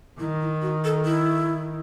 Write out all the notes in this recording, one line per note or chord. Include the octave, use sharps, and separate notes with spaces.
D#3 E4
E4
F#4
A4
E4